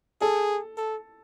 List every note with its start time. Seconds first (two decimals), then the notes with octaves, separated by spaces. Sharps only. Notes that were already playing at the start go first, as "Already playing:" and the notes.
0.21 G#4 A4
0.77 A4